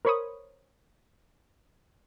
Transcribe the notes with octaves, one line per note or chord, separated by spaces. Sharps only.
A#4 C5 C#5 B5 C#6 D#6